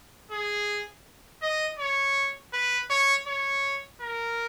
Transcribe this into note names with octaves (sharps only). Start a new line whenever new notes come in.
G#4
D#5
C#5
B4
C#5
C#5
A#4